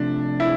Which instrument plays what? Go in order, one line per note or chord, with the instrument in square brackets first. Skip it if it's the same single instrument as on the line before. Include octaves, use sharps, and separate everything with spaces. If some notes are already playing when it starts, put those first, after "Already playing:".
Already playing: [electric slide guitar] C3 F3 A3 [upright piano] D4
[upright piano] E4